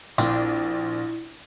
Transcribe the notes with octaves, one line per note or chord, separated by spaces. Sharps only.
A#1 C4 D4 E4 F4